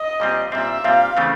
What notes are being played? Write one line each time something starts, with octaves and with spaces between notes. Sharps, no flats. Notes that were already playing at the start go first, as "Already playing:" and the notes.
Already playing: D#5
A#2 G3 C4
A#2 G3 C4 E5
A#2 G3 C4 F5
C#3 E3 A3 C4